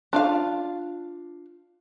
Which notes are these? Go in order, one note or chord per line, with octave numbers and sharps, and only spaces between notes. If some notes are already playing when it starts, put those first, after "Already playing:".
D4 F4 F5